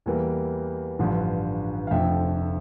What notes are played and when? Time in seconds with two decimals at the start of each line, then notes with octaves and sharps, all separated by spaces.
0.06 E2 E3 G3 A#3
0.99 A1 G2 D3 F3
1.87 F5
1.91 F1 F2 D3 F3 A3 E5 G5